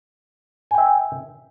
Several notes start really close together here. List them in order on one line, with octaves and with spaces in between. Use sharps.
G#5 G5 E5